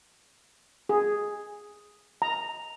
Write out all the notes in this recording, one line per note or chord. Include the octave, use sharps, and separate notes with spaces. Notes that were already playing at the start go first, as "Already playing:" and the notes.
G#4
A#5